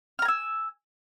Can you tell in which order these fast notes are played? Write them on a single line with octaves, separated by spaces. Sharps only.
F6 A#5 G#5 E6